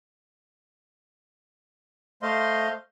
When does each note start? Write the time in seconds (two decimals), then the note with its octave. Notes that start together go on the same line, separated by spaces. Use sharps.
2.22 A3 C5 D#5 F5 C6